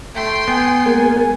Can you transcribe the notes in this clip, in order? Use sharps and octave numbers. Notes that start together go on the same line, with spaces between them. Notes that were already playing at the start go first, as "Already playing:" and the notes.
A3 G5 C6
B3 G#5
G#3 A#3 A#4